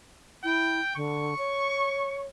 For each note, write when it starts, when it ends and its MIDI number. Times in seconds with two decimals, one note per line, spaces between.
0.44 0.80 64
0.44 0.93 79
0.96 1.34 50
0.96 2.20 85
1.38 2.26 73